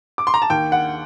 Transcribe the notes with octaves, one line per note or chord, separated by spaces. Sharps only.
D6
C6
A#5
A5
D#2 G5
F#5